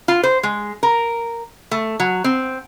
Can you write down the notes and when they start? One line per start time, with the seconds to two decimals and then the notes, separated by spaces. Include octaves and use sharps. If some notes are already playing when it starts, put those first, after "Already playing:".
0.08 F4
0.23 C5
0.43 G#3
0.83 A#4
1.71 A3
2.00 F#3
2.24 C4